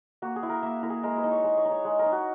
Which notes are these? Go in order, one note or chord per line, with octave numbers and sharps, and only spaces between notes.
A#3 F#4
G#4
E4
A#4
A#3 E5
E4 A#4
G#4
G#3 A#4
B4
D#4
C#5
G#3
C#5
D#4
C#5
G#3
A#4
D#4
F#4